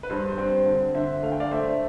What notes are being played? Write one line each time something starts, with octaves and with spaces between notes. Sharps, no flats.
B4
G2 C5
C5
C4
C5
D3
D3 C5 E5
A3 F5
G5
D5 F5
A3 C5 E5